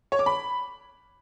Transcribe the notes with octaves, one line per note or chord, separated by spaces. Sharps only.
C#5
D6
B5